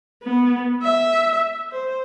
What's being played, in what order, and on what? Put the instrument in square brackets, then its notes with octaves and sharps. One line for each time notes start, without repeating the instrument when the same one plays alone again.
[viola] B3
E5
C5